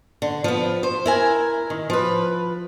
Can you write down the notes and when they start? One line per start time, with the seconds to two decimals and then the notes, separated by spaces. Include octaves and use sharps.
0.22 D3
0.44 F3 B3
0.83 C5
1.06 E4 A#4 G#5
1.70 D#3
1.90 F3 B4